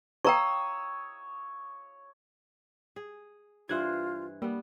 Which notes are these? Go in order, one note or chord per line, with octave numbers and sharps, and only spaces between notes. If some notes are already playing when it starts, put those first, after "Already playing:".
C#5 G5 A#5 C#6 D#6 E6
G#4
G2 E3 F4 C5 E5 F#6 G#6
G3 A#3 B3